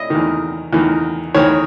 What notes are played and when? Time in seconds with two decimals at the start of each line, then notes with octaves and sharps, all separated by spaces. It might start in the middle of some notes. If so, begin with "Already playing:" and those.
Already playing: E4 D#5
0.10 E2 D#3
0.73 E2 D#3
1.34 E2 D#3 C#5